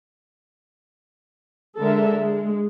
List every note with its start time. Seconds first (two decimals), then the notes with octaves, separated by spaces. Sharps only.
1.80 D3 G#3 A4 A#4 E5
2.18 G#3